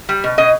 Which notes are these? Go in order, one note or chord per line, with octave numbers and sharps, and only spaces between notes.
G3
B2
B2 D#5